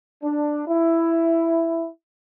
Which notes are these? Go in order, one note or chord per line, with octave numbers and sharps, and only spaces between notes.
D4
E4